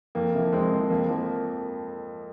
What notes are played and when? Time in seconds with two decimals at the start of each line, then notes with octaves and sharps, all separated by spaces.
0.15 F2 A#3
0.34 C3 F3
0.52 F2 G#3 C4
0.72 C3 F3
0.90 F2 A#3
1.09 F3 A#3